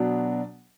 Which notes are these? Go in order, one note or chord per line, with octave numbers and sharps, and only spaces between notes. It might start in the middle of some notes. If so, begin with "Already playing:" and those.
Already playing: B2 F#3 B3 D4